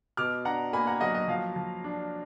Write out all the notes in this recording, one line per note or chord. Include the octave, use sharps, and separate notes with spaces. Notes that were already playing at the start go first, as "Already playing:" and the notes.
B2 D6 F6
D4 F#5 A#5
A#3 G#5 B5
F#5 A#5
F#3 D#5 F#5
D#5
F3 F5
F3
D4